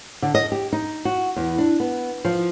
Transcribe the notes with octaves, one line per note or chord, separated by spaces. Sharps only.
D3
D#5
G4
D#4
F#4
E2
D4
B3
F3